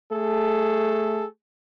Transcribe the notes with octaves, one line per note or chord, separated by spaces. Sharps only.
A3 G#4 A4